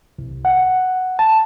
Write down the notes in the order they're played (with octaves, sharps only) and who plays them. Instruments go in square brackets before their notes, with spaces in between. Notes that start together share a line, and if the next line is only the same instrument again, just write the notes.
[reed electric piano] C2
F#5
A5